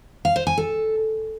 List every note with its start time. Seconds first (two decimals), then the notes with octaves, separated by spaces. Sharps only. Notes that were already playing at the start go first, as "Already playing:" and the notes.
0.25 F5
0.36 C5
0.47 G#5
0.58 A4